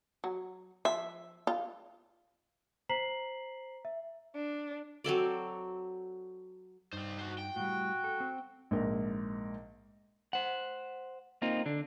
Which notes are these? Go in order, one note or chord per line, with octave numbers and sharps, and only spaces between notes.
F#3
F3 E5
F4
C5 A#5 B6 C7 F#7
E5
D4
F#3 C4 A4 D5
G2 G3 D#4 C5
F#4 C5
G5
A2 G3 F#4
A4
C4
A#1 G#2 A#4
C5 F#5
A#3 C4 D#4 F4
D3 D4